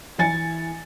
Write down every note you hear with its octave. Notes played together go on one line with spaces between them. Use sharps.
E3 E4 G#5 A6 C#7